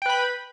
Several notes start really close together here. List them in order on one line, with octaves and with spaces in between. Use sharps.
G5 B4 B5